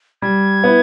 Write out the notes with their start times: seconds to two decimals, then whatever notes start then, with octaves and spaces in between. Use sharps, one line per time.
0.22 G3 G#6
0.64 B3 E4